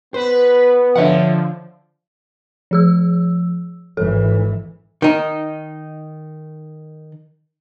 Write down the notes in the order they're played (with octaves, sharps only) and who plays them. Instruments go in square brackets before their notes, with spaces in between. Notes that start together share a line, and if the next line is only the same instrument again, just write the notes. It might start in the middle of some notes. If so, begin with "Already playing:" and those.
[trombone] B3 [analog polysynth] B4 [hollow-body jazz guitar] C5
[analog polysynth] D3 F3 [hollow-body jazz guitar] C#5 E5 F#5
[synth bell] F3 G#4 E6
[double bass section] G#1 E3 [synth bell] A4
[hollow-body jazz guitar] D#3 D#4